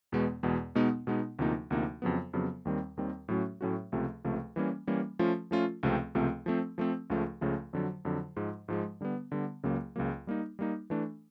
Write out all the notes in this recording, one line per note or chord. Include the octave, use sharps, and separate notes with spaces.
E2 B2 G#3 B3
E2 B2 G#3 B3
B2 G#3 B3 D#4
B2 G#3 B3 D#4
D2 C3 F3 A#3 D#4
D2 C3 F3 A#3 D#4
F2 C#3 F#3 B3
F2 C#3 F#3 B3
D#2 D#3 G3 C4
D#2 D#3 G3 C4
A2 F#3 A3 C#4 F#4
A2 F#3 A3 C#4 F#4
C#2 C3 F3 A3
C#2 C3 F3 A3
E3 G3 A#3 C#4
E3 G3 A#3 C#4
F3 A3 C#4 F4
F3 A3 C#4 F4
C#2 C3 F3 A3 C4
C#2 C3 F3 A3 C4
F3 A3 C4
F3 A3 C4
C#2 C#3 F3 A3
C#2 C#3 F3 A3
F2 D3 F#3
F2 D3 F#3
G#2 F3 G#3
G#2 F3 G#3
D3 G3 B3
D3 G3 B3
C#2 C#3 F#3 A#3
C#2 C#3 F#3 A#3
G3 A#3 D#4
G3 A#3 D#4
E3 A3 D4